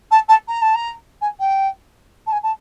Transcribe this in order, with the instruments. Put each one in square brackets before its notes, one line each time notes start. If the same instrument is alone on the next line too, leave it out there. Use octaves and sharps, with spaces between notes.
[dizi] A5
A5
A#5
A5
A#5
G#5
G5
A5
G#5
A5